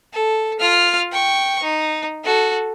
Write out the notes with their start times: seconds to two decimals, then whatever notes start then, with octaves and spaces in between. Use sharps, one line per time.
0.13 A4
0.60 F4 F6
1.12 G5 C#6
1.63 D#4
2.24 F#4 A4